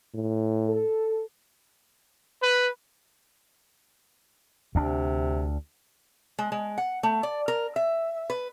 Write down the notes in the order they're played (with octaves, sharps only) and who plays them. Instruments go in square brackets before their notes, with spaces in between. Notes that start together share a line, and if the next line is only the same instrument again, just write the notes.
[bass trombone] A2
[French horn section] A4
[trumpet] B4
[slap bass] D2 D4 [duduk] C3
[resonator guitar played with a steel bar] G#3
G#3
F#5
A3
D5
A#4
E5
B4